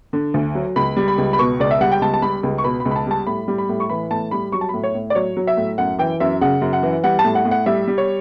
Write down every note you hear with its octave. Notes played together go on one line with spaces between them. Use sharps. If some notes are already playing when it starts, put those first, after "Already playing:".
D3
D2
F#3
C#2 B5
G3
B5
C#2
B5
B2 C#6
C#2 D5
E5
G3 F#5
G5
C#2 A5
A5
G3 B5
C#2
C#6
B2 B5
B5
C#2
B5
A5
G3 A5
A2 B5
G3
B5
A2
C#6
E3 B5
A2 A5
G3 B5
F#3 C#6
A5
A2 B5
C#5
A2
D5
F#3 C#5
F#3
E5
A2
F#2 F#5
E3 G5
F#2 E5
C#3 F#5
F#2
F#5
E3
G3 F#5
A5
A2
F#5
A2
F#5
G3 E5
G3
C#5